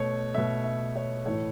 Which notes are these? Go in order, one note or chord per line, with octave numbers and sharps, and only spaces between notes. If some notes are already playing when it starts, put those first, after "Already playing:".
Already playing: B2 A3 C#5
B2 A3 E5
E5
C#5
A2 E3 A3 C#5